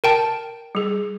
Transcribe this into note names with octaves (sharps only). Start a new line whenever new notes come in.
A#4 G5 A5
G3 G#4